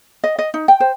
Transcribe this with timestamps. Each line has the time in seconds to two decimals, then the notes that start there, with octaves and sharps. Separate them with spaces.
0.24 D#5
0.39 D#5
0.54 D#4
0.68 G5
0.80 C5